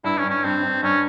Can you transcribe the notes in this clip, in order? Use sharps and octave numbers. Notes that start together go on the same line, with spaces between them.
G2 E4
C#4
G2
C#4
G2 C4
G2
G2 C#4